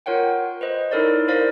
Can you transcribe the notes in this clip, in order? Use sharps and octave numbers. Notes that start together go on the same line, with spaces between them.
F4 A#4 C#5 F#5 G5
B4 C5 D#5
D#4 E4 A4 A#4 C#5 D5
E4 A#4 C5 D5 F5